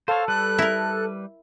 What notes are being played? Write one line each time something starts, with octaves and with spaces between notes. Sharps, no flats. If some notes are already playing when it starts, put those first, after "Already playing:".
A4 C5 C#5 F5
G3 B4 F#6
E4 A#4